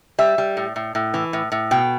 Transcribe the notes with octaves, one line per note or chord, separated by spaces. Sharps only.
G3 E5
G3
A2
A2
A2
E3
A2
A2
B2 G5